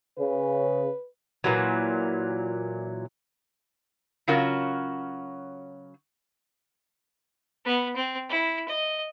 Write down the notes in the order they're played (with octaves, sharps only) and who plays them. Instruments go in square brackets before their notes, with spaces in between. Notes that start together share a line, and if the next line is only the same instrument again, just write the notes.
[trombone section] C#3 [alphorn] B4
[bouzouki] A#2 E3 F#3
[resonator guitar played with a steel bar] C#3 F#3 C#4 F4 F#4 A#4
[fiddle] B3
C4
E4
D#5